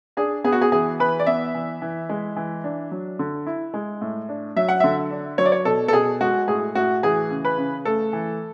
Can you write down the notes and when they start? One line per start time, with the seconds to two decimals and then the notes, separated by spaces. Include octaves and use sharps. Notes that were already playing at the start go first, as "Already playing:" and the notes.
0.17 D4 G#4
0.44 B3 G#4
0.52 F#4
0.61 G#4
0.72 E3 G#4
1.00 E3 B4
1.19 D5
1.26 B3 E5
1.55 E3
1.82 E3
2.09 G#3
2.36 E3
2.64 D4
2.91 F#3
3.19 D3
3.47 E4
3.74 G#3
4.01 A2
4.29 D4
4.56 F#3 E5
4.68 F#5
4.80 D3 E5
5.11 D4
5.38 F#3 C#5
5.45 D5
5.52 C#5
5.65 B2 A4
5.88 A4
5.93 B2 G#4
6.21 G#3 F#4
6.48 A2 G#4
6.75 A2 F#4
7.03 E3 G#4
7.30 C#3
7.45 B4
7.58 C#3
7.85 A3 A4
8.13 E3